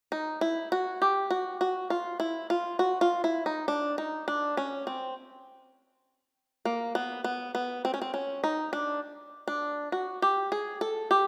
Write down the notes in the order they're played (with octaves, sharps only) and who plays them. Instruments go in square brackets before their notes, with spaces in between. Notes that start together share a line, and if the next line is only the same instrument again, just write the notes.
[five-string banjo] D#4
E4
F#4
G4
F#4
F#4
F4
E4
F4
F#4
F4
E4
D#4
D4
D#4
D4
C#4
C4
A#3
B3
B3
B3
C4
C#4
C4
C#4
D#4
D4
D4
F#4
G4
G#4
A4
G4